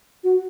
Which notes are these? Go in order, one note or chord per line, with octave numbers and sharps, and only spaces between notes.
F#4